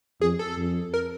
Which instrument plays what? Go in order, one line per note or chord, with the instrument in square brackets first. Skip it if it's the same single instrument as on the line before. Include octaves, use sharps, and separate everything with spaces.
[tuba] F2 [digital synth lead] G#4
[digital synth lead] A4
[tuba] F2
[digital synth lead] A#4